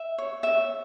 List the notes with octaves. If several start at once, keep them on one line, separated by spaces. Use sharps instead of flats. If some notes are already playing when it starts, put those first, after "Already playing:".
Already playing: E5
C#5
E5